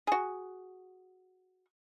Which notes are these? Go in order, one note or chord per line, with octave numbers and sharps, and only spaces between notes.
F#4 G#4